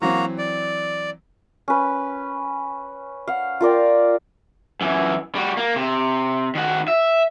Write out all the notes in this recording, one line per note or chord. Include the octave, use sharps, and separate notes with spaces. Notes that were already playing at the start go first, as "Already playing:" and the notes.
E3 F#3 A#3 C4 F#4 A#5
D5
C#4 B4
F5 F#5
F4 A#4 D5 G5
F#2 E3
G3 F#4
A#3
C3
D#3 F#4
E5